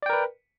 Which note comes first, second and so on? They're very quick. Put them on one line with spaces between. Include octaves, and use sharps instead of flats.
D5 G5 A#4 B4